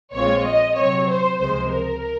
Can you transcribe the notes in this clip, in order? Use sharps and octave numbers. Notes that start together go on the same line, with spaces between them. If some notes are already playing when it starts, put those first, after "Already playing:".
A#1 A#2 G#3 C4 F4 C#5
D#5
C3 F#3 C4 C#5
C5
C#2 C3 F3 G#3 C5
A#4